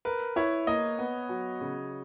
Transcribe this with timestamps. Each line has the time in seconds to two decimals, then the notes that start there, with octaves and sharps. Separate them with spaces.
0.05 A#4 B4
0.36 E4 C#5
0.67 A#3 D#5
0.99 B3
1.29 F#3
1.61 C#3